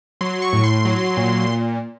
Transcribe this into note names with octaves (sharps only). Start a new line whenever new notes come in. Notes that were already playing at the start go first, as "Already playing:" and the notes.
F#3 C6
C#6
A2
C6
F#3
A#2